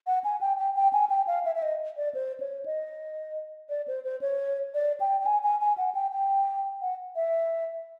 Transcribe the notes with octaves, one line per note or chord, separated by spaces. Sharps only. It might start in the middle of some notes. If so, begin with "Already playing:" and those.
F#5
G#5
G5
G5
G5
G#5
G5
F5
E5
E5
D#5
D5
C5
C#5
D#5
D5
C5
C5
C#5
D5
G5
G5
G#5
G#5
G#5
F#5
G5
G5
F#5
E5